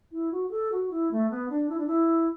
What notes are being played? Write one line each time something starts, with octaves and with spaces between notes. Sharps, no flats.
E4
F#4
F#4
A4
F#4
E4
A3
B3
D4
E4
D4
E4